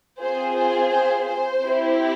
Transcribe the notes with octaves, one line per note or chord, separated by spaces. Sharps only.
C4 F4 G#4 C5
C5
C5
C5
C4 E4 G4